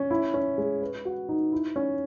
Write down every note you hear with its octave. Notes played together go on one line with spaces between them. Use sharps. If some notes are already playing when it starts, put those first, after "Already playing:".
Already playing: C#4
E4
C#4
G#3
B4
F#4
D#4
E4
C#4